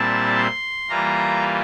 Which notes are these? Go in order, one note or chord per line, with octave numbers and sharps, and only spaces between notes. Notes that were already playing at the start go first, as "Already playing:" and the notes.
Already playing: A#2 G3 C4 E4 A5
C6
E3 G3 A#3 F4 A#5